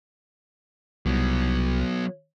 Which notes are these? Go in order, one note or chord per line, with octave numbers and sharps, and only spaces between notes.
C2 F#3 B3